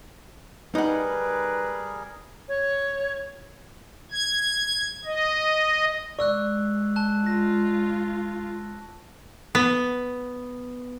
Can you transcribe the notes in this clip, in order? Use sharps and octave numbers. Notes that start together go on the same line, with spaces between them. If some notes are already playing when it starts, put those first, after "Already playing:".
G3 D#4 G#4 A#4 B4 F#5
C#5
G#6
D#5
G#3 D5 C#6 E6 F#6
A5 F#6
F4 A#6
B3